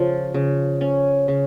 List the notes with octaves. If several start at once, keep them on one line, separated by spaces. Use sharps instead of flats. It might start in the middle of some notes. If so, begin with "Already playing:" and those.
Already playing: C#3 F3 C#4
C#3
C#4
C#3